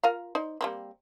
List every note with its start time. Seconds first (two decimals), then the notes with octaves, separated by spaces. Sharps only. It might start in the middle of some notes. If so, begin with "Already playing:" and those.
0.04 F4 A#4 F5
0.35 D#4 C5 D5
0.61 G3 A#3 C4